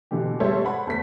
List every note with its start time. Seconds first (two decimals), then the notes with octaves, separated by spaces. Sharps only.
0.11 B2 D3 E3 G4
0.40 G3 G#3 A4 C5 C#5 E5
0.64 C5 F#5 B5
0.87 E2 A3 B6